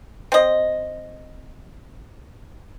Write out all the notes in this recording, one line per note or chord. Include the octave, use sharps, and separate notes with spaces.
C4 D#5